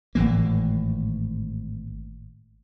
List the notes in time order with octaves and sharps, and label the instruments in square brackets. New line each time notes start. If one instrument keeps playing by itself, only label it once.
[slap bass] G#1 A2 E3 A#3